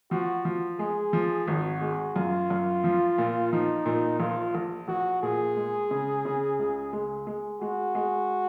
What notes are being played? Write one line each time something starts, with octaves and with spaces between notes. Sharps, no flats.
F3 F#4
F3
G#3 G#4
F3
G#1 F#4
G#3
F#2 F4
F#2
F3
A#2
F3 D#4
A#2
A#1 F4
A#1
A#1 F#4
A#2 G#4
G#3
C#3
C#3
C#2
G#3
G#3
G#3 F#4
G#3